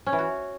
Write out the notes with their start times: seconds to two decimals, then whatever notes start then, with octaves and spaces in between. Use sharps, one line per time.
0.06 C#4
0.12 E3
0.19 F#4